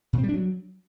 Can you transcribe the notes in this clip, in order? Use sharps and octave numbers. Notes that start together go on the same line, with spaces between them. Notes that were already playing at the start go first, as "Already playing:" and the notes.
A#2
C4
G3
D4
F#3